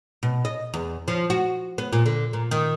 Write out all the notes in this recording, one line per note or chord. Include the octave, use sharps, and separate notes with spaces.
B2
D#5
E2
F3
F#4
B3
A#2
D3
A#2
D#3